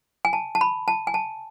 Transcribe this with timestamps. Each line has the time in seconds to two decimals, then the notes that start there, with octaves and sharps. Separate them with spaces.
0.25 G#5
0.33 A5
0.55 A5
0.61 B5
0.88 A5
1.07 G#5
1.14 A5